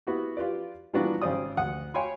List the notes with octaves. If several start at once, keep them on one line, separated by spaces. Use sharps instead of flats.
B3 E4 F#4 G4
F4 G4 B4 D5
A#2 E3 G3 B3 D4 F#4
G#1 C#3 C#4 C5 D5 D#6
D2 F#5 D#6
C#5 F5 G5 G#5 B5 C6